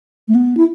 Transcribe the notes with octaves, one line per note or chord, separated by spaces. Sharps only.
A3
B3
E4